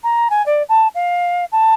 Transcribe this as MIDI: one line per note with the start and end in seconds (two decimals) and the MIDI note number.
0.03 0.28 82
0.30 0.44 80
0.46 0.63 74
0.69 0.87 81
0.94 1.44 77
1.52 1.74 81